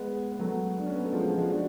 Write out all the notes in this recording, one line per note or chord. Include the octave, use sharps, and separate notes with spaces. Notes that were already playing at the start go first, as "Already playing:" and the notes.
Already playing: G#3 B3
B3
F#3 A3
D4
C#4
B3
A3
F3 G#3
F3
F3 G#3
D4 F#4